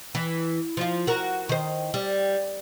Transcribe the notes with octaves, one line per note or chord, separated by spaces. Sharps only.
E3
F3 F4
F#4 A#4
D#3 C5
G3